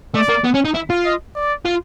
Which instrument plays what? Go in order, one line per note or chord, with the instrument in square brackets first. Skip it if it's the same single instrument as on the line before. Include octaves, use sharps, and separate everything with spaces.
[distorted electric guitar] A3 [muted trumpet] D5
[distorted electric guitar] A#3
B3
C#4
D#4
E4
F4
[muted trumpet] D#5
D5
[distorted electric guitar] F4